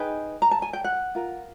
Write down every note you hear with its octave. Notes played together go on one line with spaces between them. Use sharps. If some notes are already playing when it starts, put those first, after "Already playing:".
Already playing: D#4 G#4 B4 G5
A#5
A5
G#5
G5
F#5
F4 A#4